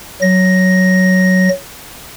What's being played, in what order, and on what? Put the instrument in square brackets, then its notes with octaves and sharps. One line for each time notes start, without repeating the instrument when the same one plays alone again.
[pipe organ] F#3 A#6